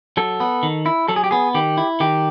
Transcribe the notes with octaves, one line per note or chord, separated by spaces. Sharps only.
F#3 A4
B3
D#3
E4
F#3 A4
G#4
G4
B3 G#4
D#3 G4
E4
D#3 G4